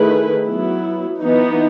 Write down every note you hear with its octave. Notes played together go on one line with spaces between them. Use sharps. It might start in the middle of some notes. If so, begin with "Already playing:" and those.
Already playing: D#3 A3 E4 G#4 B4
F#3 B3 E4
E3 B3 D#4